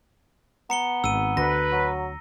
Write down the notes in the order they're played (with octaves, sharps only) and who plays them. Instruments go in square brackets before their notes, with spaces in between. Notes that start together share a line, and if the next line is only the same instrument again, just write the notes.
[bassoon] B3 [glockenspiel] A#5 C#7 G7
[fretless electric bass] G#1 [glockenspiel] E6 D#7
[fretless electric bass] D2 [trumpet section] B4 [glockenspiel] A#6
[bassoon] F#3